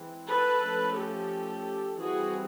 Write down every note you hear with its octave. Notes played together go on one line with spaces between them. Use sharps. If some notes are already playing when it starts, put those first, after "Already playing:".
Already playing: E3 G#3 C4
A4 B4
F3 A3 C#4
G4 A4
E3 G3 C4 F#4 G#4